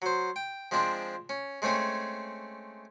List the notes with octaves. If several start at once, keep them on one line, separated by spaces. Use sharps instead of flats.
F#3 C5
G5
F3 G#3 C4 D4
C#4
G#3 A3 C4 C#4 G#4